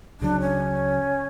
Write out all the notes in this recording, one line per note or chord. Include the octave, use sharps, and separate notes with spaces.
C#2 C#3 F#3 D4
C#4